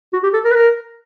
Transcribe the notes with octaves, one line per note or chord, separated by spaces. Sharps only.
F#4
G4
A4
A#4
B4
A#4